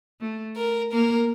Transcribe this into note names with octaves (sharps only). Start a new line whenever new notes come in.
A3
A#4
A#3 A#4